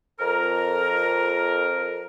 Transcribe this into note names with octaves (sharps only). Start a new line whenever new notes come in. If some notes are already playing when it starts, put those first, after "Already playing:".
F2 A#4